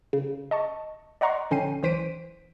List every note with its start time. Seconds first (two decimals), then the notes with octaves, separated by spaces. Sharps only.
0.13 C#3
0.51 D#5 A5 C#6
1.21 D5 D#5 F#5 A#5 C6 C#6
1.51 A#1 D3 C#4 G5 C7 D#7
1.83 B1 E3 C5 B6 D7 D#7